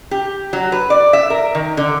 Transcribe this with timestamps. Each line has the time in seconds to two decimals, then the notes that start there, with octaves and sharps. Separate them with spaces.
0.11 G4
0.53 F#3
0.72 B4
0.90 D5
1.13 E5
1.30 A#4
1.55 D#3
1.77 D3